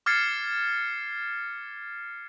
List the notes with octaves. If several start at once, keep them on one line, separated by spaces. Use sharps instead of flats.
D6 F6 G#6 A6 C7 C#7